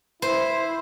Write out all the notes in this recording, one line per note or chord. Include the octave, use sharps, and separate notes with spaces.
E4 C5